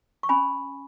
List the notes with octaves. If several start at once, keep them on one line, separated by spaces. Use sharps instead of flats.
C#6
C#4 G#5 B5